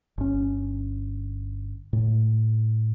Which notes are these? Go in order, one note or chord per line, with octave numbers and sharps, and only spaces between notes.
G1 C#4
A2